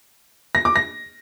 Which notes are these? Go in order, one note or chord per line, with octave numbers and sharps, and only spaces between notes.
A#6
D6
A#6